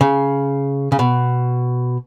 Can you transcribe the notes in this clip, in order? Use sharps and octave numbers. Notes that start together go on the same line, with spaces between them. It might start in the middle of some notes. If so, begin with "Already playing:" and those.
C#3
C#3
B2